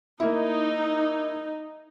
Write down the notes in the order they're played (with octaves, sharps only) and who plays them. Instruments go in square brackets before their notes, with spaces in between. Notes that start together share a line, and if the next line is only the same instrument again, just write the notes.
[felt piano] A#3 E4 [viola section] D#4